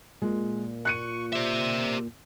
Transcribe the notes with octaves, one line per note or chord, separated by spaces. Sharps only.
A#2 G#3
C#6 F#6 C#7 D#7
G4 C5 D5 E5 E6